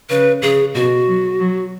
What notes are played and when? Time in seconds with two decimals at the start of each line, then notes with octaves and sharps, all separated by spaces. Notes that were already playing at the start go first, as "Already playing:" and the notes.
0.10 C#3 B4
0.42 C#3 G#4
0.74 B2 F#4
1.07 F#3
1.40 F#3